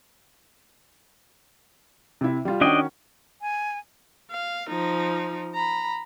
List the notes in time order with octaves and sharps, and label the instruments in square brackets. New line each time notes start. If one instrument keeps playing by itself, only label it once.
[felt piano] C3 E4
G3 F4
[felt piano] D#3 C#4 F#4 [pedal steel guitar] D4 D#5 G5
[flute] G#5
[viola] F5
F3 D#4
A#5 B5